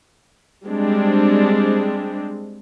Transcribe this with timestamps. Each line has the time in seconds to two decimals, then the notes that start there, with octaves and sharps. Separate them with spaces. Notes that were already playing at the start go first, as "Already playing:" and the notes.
0.65 G3 G#3 C4 D4